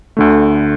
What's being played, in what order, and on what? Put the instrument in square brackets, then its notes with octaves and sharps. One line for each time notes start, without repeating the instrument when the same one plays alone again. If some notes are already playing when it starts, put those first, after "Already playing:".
[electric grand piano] D2 D3 A3